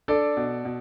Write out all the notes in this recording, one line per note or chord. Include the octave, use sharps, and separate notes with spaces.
D4 A4 D5
B2
B2